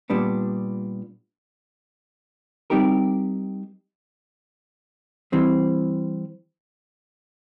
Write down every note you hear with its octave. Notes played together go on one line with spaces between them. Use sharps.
A#2 G3 B3 D4
G3 C4 D#4 G4 A#4
E3 G3 C4